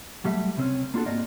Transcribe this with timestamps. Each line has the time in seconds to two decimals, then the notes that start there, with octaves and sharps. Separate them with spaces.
0.25 F#3 G3 A3 E5
0.56 C#2 C3 C4 C#4
0.94 A#3 D4 F4 F#4 A4
1.06 G#2 A#3 C4 D5 D#5